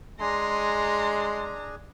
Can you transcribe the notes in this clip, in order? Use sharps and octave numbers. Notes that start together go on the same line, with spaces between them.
G#3 D4 G#4 G#5 A#5 C6